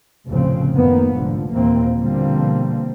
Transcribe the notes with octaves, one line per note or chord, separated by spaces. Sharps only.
F1 D2 A2 C#3 F3 C4
F#1 D#3 A#3 B3
F1 A#1 G#2 D3 F3
D#2 A#2 E3 A#3 C4
B2 D3 F3 G3 A#3 C4